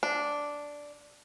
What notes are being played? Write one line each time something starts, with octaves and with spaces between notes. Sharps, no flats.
D4